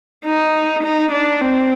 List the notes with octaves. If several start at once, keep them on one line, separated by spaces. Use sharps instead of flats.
D#4
D#4
D4
C4